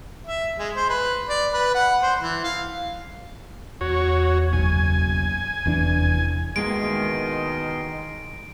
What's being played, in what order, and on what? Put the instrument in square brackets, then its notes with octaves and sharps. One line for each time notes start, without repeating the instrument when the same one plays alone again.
[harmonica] E5
G#3
C5
B4
D5
B4
F#5
C5
E3
F5
[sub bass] E2 [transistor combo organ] F#4 C#5
[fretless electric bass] F#1 B1 [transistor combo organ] G#5
[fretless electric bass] F1 E3 D4 [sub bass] E2
[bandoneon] B2 D#5 C6 [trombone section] D#3 [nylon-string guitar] G#3 A#3 E4 [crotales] D7